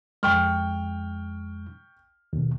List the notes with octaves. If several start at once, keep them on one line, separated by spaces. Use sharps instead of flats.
F2 G#3 G5 C#6 F6
D#2 B2